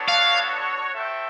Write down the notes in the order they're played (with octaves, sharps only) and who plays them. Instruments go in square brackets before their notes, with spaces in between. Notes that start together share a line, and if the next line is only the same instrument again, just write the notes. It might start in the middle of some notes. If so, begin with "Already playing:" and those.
Already playing: [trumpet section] B3 D4 F#4 A4 C#5
[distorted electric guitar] F5
[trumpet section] F#4 A4 C5 E5 G5